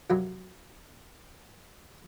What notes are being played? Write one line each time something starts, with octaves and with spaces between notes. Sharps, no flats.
A#1 F#2 C3 F#3